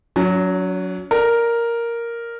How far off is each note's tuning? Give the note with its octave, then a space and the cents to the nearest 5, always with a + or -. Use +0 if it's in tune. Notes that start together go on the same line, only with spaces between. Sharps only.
F#3 -10 C#4 +35
A#4 +0 D5 +10